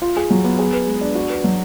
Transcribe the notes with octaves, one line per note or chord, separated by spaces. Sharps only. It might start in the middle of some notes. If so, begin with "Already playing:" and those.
F4
G#4
F#3
B3
G#4
B4
G#3
D4
F#4
B4
F#3